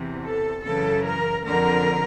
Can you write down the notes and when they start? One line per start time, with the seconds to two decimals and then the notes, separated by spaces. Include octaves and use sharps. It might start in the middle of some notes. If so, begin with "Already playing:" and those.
Already playing: E2 C3 E3
0.22 A4
0.63 F#2 C#3 E3 A4
1.04 A#4
1.45 F2 D3 A#4